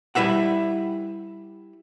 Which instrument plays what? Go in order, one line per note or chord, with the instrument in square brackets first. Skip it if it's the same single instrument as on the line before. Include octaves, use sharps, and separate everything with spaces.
[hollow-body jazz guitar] G3 E4 B4 E5 F#5